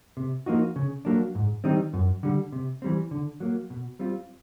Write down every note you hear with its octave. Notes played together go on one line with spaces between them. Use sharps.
C3
F3 A#3 D#4 F#4
C#3
F#3 A#3 D4
G#2
D#3 G3 C4 D#4
F#2
D3 G3
C3
E3 G3 C4
D3
F#3 A#3
B2
G3 C4 F4